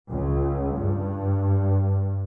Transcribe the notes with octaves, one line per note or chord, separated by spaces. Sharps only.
C#2
G2